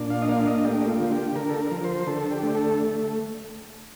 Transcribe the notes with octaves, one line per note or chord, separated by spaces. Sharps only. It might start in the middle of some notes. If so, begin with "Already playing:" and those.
Already playing: A#2 D4
F5
D#5
A#3 F5
D#5
A3 G4
F4
D3
G4
D3 A#4
A4
A#4
F3
C5
D3 A4
G4
A3
A4